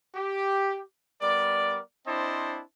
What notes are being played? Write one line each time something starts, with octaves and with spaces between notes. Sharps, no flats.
G4
G3 B3 A#4 D5
C4 D4 E4 C5 D#5 A5